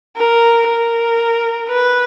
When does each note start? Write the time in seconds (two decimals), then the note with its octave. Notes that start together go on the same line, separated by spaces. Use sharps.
0.17 A#4
0.68 A#4
1.68 B4